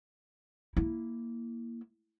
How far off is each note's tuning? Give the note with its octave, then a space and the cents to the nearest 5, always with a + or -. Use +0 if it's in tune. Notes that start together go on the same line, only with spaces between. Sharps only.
A#3 +0 E4 +0